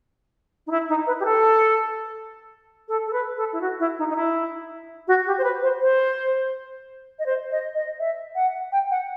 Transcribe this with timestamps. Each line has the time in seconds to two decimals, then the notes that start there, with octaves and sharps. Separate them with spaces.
0.66 D#4
0.70 E4
0.88 D#4
1.06 B4
1.19 G4
1.25 A4
2.88 A4
3.06 A4
3.12 B4
3.36 A4
3.52 E4
3.61 F#4
3.79 E4
3.98 D#4
4.09 D#4
4.16 E4
5.07 F#4
5.26 G4
5.38 C5
5.43 B4
5.62 C5
5.80 C5
7.18 D#5
7.25 C5
7.50 D#5
7.74 D#5
7.99 E5
8.35 F#5
8.72 G5
8.90 F#5